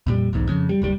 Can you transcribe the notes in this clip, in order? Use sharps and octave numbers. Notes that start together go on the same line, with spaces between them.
F2 A#2 G3
B1 E2 G#2
F2 C#3
G3
F#1 D#2 G3